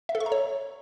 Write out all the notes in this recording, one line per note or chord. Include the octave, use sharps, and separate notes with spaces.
E5
A4
C#6
A#5
C#5